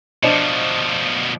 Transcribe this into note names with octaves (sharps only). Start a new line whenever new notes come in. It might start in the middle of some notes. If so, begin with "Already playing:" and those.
B2 F3 D4 C5 D#5